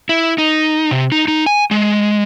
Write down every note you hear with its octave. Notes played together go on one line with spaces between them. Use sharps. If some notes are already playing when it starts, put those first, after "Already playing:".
E4
D#4
C3
D#4
D#4
G#5
G#3